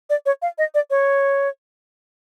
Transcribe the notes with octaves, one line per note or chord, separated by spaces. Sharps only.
D5
C#5
F5
D#5
D5
C#5